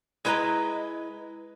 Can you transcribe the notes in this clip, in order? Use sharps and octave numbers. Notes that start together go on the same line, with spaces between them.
G#3 E4 B4 D#5 A#5